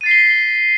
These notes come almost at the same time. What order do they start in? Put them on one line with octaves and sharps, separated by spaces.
D#7 A6 C7 B6 G7